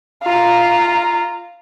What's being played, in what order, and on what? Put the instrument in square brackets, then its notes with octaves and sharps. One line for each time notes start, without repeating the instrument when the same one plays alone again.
[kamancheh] F4 A#5